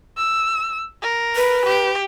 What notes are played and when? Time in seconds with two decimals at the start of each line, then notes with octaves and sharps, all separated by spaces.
0.18 E6
1.03 A#4
1.36 B4
1.66 G4